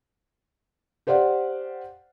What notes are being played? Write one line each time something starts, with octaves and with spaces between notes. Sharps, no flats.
G4 C5 D5 F5 F#5